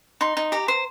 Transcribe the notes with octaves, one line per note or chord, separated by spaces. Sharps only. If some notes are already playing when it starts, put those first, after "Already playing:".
D#4 C6
D#4
G4 A#5
C5